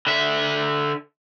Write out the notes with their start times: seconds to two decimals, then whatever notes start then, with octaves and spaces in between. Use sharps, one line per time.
0.07 D3 E5